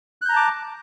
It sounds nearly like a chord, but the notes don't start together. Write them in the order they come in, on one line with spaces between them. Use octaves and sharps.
F#6 G6 A#5 A5 D6